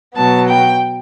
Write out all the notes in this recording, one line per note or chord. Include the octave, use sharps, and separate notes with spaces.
B2 F#3 B3 A5
G5